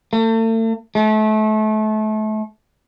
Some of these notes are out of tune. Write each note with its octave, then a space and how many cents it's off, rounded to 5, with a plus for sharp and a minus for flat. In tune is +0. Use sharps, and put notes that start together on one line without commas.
A3 +40
A3 -30